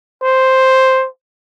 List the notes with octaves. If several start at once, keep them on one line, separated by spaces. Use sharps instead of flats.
C5